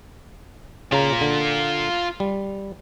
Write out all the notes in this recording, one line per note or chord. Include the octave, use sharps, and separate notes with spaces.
C#3 F4 A#5
D3
G3